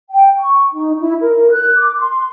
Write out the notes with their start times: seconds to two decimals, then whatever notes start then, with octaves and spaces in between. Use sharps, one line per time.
0.11 G5
0.38 C#6
0.73 D#4
1.00 E4
1.21 A#4
1.51 F#6
1.77 D6
1.98 C6